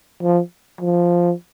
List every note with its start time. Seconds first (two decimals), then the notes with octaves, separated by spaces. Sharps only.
0.23 F3
0.81 F3